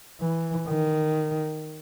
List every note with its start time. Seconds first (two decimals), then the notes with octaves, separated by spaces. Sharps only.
0.21 E3
0.68 D#3